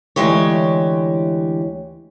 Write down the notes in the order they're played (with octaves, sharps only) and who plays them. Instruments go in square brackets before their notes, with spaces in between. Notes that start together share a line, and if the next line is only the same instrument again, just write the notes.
[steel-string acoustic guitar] D2 E3 G#3 G4 C#5